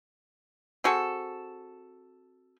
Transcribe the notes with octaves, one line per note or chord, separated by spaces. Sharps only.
C4 F#4 G#4 A4